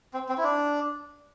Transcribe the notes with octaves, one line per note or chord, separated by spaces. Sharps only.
C4
C4
E4
D4